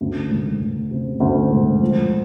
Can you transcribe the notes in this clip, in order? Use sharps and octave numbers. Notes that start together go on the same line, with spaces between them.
D2
E1
E1
C3
D2
E1
F3